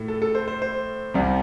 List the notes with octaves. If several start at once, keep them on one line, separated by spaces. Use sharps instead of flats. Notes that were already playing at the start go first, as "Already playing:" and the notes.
Already playing: A2 A3
A4
A4
C5
C5
C5
C2 C3 G3